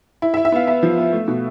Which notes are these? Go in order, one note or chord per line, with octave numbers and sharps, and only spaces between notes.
E4
E5
E4
E5
B3 F5
B3 E5
F3
B3
A3
B2